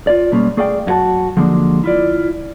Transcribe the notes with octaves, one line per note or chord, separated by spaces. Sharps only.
F4 D5
B2 G3 G#3 A#3 C#4
A3 G#4 D5 F5 G5
F#2 E4 F#4 A#4 F#5 A5
D3 F3 F#3 G#3 A#3 D4
E4 F4 D5